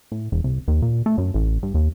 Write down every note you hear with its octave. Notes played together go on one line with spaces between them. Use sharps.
A2
E1
C2
D#2
A#2
A3
F#2
A1
G2
D#2